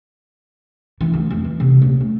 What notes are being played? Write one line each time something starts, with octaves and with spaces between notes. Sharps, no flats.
E3
D2
F2
E3
C3
D#1
A3